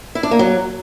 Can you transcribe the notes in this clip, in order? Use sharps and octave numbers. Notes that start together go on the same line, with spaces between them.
E4
D4
A#3
F#3